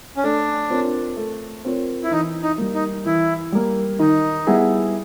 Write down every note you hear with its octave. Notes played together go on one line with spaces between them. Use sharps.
C#4
A3 D4
C4 F4 A#4 C#5
A3
C4 F4 A#4 C#5
E4
E3 D#4
D#4
G3 A#3
D#4
E3 E4
G3 A#3
D#3 D#4
G3 B3 E4 G#4